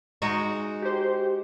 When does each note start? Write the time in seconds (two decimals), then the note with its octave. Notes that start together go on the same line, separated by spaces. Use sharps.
0.22 G#3 D#4 F#4
0.82 G4 C5